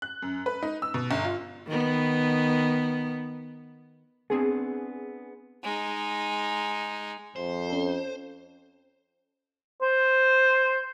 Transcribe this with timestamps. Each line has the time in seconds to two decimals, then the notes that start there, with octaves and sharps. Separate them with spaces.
0.02 F#6
0.22 F#2
0.46 B4
0.63 D#4
0.82 E6
0.94 B2
1.11 G1
1.25 F4
1.67 D#3 B3
4.30 B3 C4 D4 G#4
5.63 G#3 D#4
7.36 F2 C5
7.70 C#4 A4
9.82 C5